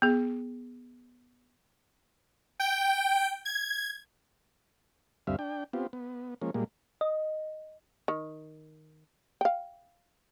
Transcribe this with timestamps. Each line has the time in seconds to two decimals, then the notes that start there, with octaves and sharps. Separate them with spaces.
0.02 B3 G#4
2.60 G5
3.45 G#6
5.27 D2 G2 G3 C4 E5 F5
5.39 D4 G5
5.73 B3 C4 F4 G4
5.93 B3
6.42 F3 G#3 A#3 C#4
6.54 A#2 G3 G#3 A#3
7.01 D#5
8.08 D#3
9.41 F5 G5